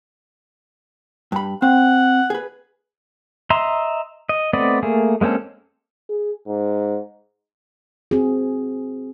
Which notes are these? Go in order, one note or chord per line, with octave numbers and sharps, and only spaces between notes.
G2 B5
C4 F#5
G#4 B4
D#5 E5 A#5 C6
D#5
A3 B3 C4 D5 D#5
A3 A#3 G#4
G#3 A#3 C4 C#4 A4
G#4
G#2
C4 F#4 G#4